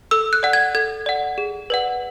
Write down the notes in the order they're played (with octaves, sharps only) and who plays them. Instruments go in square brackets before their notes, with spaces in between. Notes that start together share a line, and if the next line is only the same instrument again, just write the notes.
[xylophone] A4 E6
F#6
D5 F#5
G#6
A4 G#6
D5 F#5
G#4
B4 D5 F#5